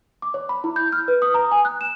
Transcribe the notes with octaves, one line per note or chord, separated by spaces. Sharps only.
D6
C#5
B5
E4
G6
F6
B4
D#6
A#5
G#5
F#6
E7